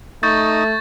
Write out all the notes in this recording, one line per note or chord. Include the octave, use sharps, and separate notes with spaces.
A3 D#4 C#6 G6 A6